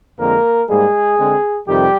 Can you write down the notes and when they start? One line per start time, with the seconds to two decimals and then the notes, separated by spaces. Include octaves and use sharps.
0.18 F2 D3 G#3 A#3 C4 A#4
0.68 G#2 G3 G#3 A#3 G#4
1.18 D3 G#3 C4
1.67 F2 C3 D#3 G3 G4